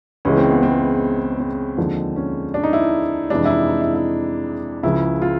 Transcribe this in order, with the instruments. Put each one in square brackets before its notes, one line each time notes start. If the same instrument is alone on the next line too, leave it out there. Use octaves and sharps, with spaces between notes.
[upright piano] C#2 C#3 E3 G#3 C#4
C4
B3
C4
C4
D#2 D3 F3 G#3
C#4
D4
D#4
E4
F2 C3 E3 G#3 D4
E4
D#4
D#4
E4
E4
C#2 C#3 F3 E4
F4